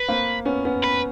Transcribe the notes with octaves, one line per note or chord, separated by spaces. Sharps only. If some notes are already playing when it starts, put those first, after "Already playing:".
Already playing: B4
A#3 C4
B3 C#4
B3 C#4
B4